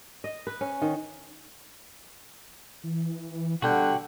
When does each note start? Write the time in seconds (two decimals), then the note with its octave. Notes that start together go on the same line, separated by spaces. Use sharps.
0.24 D#5
0.47 B4
0.61 C#4
0.82 D#3
2.84 E3
3.62 B2 D3 G3 F#4 F#5 G5 G6